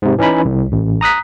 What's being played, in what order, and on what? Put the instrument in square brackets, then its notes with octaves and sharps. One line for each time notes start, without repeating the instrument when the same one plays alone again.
[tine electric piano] G#2 C3
E3 C#4 D#4 B5
C2
A1
A#5 D#6 F#6 B6